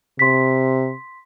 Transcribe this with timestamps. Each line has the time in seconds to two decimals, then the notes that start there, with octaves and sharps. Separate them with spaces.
0.19 C3 C6 B6